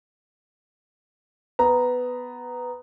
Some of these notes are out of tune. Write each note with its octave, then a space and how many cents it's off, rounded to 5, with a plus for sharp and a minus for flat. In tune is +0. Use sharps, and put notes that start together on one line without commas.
B3 +10 A#5 +0